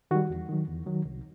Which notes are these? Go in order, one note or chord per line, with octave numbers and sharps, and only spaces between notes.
D#3 G3 F#4
E2
D#3 F#3
E2
D#3 F#3
C2